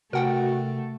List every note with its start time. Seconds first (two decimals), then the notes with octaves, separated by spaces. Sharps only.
0.13 C3 A3 F#4 A#4 F#5 G5